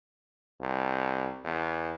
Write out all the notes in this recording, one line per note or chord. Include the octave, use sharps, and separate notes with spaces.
C2
E2